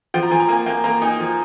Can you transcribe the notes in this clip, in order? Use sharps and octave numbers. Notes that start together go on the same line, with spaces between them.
F3 G5
A#5
F3 G#5
A#5
A#3 G#5
A#3 G5
A#3 A#5
D#4 G#5
F3